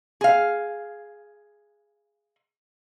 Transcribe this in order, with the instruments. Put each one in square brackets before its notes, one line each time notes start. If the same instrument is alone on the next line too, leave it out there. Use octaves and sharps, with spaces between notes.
[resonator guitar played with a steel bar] G#4 F5